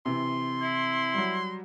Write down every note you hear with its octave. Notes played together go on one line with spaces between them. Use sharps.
C3 E3 C6
E4
F#3 G3